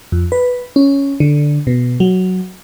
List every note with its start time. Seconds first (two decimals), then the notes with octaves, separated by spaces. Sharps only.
0.12 F2
0.32 B4
0.76 C#4
1.20 D3
1.67 B2
2.00 F#3